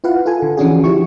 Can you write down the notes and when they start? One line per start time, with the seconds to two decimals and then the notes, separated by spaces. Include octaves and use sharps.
0.04 E4 F4 B4 F5 F#5
0.26 F4 A4 G#5
0.42 D3
0.57 E3 F3 C#4 D4 F#4 G#4
0.84 F3 E4 G4 C#6